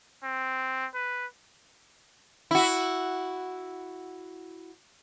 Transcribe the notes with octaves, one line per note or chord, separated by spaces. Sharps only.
C4
B4
E4 F#4